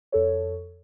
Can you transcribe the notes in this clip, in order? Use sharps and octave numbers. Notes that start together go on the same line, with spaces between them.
F2 A4 C#5